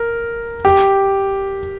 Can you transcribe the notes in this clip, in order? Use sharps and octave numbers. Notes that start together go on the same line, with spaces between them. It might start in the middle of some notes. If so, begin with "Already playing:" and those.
Already playing: A#4
G4